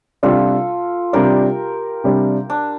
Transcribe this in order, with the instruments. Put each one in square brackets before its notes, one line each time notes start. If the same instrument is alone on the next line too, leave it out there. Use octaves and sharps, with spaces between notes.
[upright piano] C3 G3 D4 [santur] F4 A4
[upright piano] C3 G3 D4 [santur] G4 A#4
[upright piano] C3 G3 D4
[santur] D4